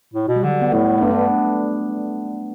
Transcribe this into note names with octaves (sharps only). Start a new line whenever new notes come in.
A2
B2
G3
D3 F#3
B3
A2 A3
A3
G2 B3
D4